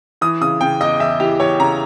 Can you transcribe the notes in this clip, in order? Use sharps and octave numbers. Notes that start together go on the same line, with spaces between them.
E3 D#6
C#3 D#6
C#3 G5
E2 D#5
E2 E5
E3 G4
E2 C#5
C#3 A#5